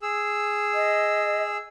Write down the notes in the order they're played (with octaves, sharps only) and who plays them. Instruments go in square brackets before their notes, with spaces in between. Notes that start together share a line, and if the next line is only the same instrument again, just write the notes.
[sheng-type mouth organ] G#4 E6
[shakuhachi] D#5